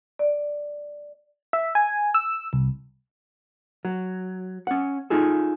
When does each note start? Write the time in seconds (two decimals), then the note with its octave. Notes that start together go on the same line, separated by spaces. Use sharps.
0.19 D5
1.53 E5
1.75 G#5
2.14 E6
2.53 C2
3.85 F#3
4.67 C#4 F#5
5.10 D#4 F4 G#4 A4